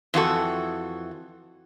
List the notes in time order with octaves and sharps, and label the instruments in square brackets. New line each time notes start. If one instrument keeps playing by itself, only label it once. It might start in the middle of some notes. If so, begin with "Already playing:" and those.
[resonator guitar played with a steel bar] F2 E3 F#4 A4